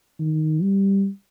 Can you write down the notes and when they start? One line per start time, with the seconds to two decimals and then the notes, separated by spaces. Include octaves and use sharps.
0.19 D#3
0.62 G3